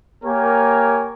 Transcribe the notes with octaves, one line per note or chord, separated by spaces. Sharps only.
A#3 G4 A#4 C#5 G#5